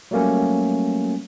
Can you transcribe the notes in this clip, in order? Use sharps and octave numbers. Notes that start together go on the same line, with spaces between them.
F#3 G3 A3 A#3 C#4